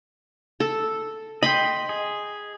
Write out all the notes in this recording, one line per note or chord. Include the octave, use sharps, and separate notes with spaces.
A4
D#5 G5 B5 C6
G#4